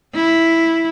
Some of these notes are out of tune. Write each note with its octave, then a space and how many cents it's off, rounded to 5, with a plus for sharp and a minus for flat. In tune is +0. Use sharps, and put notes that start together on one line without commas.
E4 -5